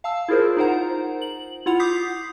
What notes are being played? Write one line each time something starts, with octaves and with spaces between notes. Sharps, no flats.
F5 A5 E6
E4 F4 G#4 A#4 C5
D#4 F4 A#4 C5 F#5 A#5
F#7
E4 F4 F#5 F7
D6 D#6 G6 B6 C7